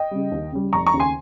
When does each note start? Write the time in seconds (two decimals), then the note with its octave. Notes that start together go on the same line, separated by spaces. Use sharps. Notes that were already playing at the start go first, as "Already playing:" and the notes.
Already playing: D#5 G5
0.11 C#3 G3
0.32 D#2
0.52 C#3 G3
0.73 F1 A#5 C#6
0.86 A#5 C#6
0.94 D#2 C#3
1.00 G#5 C6